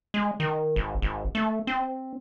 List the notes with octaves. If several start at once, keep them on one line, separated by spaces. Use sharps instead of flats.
G#3
D#3
G#1
G#1
A3
C4